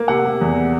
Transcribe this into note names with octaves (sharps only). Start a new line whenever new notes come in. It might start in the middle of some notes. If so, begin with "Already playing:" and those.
Already playing: A#3
C3 F#5
C3
E2